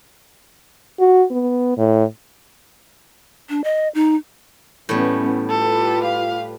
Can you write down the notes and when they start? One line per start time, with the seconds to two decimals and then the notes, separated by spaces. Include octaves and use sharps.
1.00 F#4
1.31 B3
1.77 A2
3.49 D4
3.64 D#5
3.95 D#4
4.89 A2 E3 G3 B3 C#4
5.49 F4 G4 A4 B4
6.04 F5